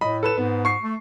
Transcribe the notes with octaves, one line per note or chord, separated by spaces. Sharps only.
A2 D#5 B5
A4 B4 E7
G#2 B3
C#6 C7
A3